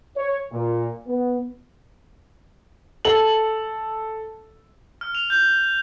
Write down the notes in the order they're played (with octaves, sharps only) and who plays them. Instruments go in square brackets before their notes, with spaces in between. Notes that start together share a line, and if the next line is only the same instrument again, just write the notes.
[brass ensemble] C#5
A#2
B3
[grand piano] A4 F#7
[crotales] F6
F7
G6